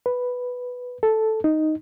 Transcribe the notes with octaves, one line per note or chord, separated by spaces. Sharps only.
B4
A4
D#4